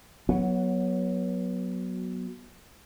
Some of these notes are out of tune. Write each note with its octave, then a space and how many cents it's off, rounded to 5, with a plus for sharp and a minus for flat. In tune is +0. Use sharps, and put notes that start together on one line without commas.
F#3 +0 B3 -20